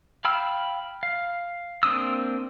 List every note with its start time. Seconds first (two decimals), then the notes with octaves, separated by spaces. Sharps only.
0.25 F5 G5 B5 E6 F6
1.03 F5
1.83 A#3 C4 D4 D#6 E6